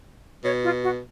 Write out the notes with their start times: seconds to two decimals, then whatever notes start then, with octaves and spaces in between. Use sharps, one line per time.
0.44 B2 C#5
0.64 F4
0.83 F#4